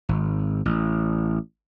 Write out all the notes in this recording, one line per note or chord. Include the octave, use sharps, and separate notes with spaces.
G#1
A1